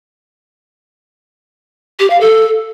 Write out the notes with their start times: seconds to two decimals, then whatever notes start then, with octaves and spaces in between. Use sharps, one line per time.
2.00 G4
2.10 F5
2.21 A4